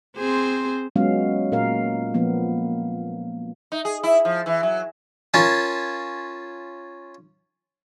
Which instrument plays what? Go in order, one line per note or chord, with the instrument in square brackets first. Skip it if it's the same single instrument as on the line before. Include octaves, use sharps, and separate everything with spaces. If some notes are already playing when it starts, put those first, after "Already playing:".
[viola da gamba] C4 G#4 C5
[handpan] F#3 G#3 B3 C#4 F#4 F5
A#2 A#4 F5
F3 A#3 B3
[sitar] D#4
G#4
E4
F3
E3
F#3
[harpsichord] C#4 F4 A#4 G#5 A5